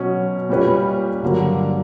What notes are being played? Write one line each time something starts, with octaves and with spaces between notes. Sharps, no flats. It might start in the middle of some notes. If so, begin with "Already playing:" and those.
Already playing: B2 F#3 C#4
A#2 G3 C#4 G4 B4
G2 D3 F#3 A#3